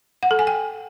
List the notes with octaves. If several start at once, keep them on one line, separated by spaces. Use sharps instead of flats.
F#5
A4
G#5
G5